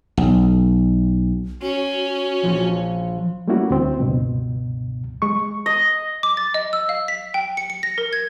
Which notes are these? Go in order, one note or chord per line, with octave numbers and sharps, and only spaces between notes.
B1
C#4 F#4
A#1 F3
G3 A3 A#3 C#4 E4 F#4
D2 C4
C#2 G2 B2
G#3 C#6
D#5
D6
A6
D#5
E6
F5
B6
G5
C#7
C#7
A#6
A#4
G#6